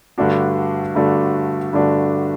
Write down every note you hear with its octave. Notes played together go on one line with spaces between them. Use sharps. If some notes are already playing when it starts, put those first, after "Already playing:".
G2 D3 A3 D4 F#4
G2 D3 A3 D4 F#4
G2 D3 A3 D4 F#4